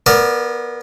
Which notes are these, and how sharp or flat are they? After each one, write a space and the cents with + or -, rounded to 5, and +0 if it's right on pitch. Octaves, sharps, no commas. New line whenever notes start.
B3 -20 A#4 +0 D5 +0